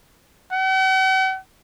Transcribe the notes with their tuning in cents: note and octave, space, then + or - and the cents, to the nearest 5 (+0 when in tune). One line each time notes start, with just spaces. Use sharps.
F#5 +45